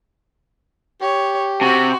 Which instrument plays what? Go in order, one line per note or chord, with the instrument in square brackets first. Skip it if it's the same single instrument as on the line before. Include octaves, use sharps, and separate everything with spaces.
[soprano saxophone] G4 [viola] C#5
[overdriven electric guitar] C3 [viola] F#4